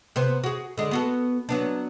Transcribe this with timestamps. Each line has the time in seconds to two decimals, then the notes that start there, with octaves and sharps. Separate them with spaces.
0.16 C3 B3 C5
0.44 F#4 G#4
0.77 D3 G#3
0.91 B3 F#4 A4
1.49 F#3 B3 D4